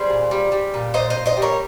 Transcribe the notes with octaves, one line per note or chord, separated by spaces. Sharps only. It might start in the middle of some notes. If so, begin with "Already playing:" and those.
Already playing: G3 G#4 C5
A#2
G3
G3
A#2
A#2 C5 D#5
C5 D#5
A#2
C5 D#5
G3
A#4 C#5